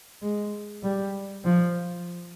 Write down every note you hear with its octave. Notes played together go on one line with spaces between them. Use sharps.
G#3
G3
F3